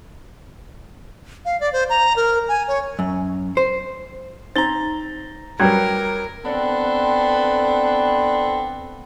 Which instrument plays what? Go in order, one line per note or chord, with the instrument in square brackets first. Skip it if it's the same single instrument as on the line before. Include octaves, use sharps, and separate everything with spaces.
[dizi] F5
D5
C5
A#5
A#4
G#5
C#5
[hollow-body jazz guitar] F#2
C5
[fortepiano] C4 [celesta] D#4 G7 [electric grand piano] A#5 A6
[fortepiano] F#3 G3 [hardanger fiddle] A#4 [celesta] B4 G5 G#6
[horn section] B3 C4 D4 A4